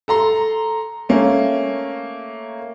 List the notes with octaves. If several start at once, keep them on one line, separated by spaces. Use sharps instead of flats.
A4 A#5 C6
A3 A#3 C#4